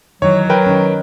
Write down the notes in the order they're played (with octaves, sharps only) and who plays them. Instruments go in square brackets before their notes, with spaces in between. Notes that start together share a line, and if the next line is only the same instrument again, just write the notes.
[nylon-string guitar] D#3 E3 [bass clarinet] F#3 [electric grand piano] C#5
[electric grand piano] A#4 B4 G5
[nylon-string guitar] D#3 C#4